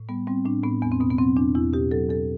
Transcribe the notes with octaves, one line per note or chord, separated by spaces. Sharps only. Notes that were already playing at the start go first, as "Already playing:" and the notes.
Already playing: A2
G3 B3
G3 C4
A2 D4
A2 B3
E2 B3
C4
B2 B3
B3
F#3 C4
E2 D4
E2 E4
B2 G4
F#3 A4
E2 A4